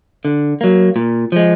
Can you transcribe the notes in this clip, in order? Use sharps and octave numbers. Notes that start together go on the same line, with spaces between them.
D3
F#3 A#3
A#2
F3 G#3